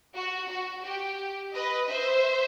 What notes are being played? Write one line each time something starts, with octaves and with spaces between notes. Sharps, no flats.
F#4
F#4
G4
B4 D#5
C5 E5